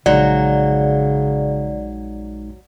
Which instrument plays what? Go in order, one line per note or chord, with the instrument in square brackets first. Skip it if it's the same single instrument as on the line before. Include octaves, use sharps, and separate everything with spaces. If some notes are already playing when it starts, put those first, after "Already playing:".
[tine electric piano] A#1 G#3 D#4 [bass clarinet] C#3 [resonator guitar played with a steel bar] F#3 [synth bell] D5